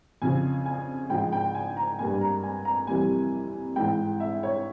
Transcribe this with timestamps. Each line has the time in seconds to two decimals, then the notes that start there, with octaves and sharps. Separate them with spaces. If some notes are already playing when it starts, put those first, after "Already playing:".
0.22 F2 C#3 F3 G#5
0.66 G#5
1.10 G#2 F3 G#3 G5
1.32 G5
1.55 G#5
1.77 A#5
1.99 G2 G3 A#3 G#5
2.14 G#5
2.21 A#5
2.43 G#5
2.65 A#5
2.87 F2 C3 E3 G3 A#3 G#5
3.76 G#2 E3 G#3 G5
4.20 E5
4.43 C#5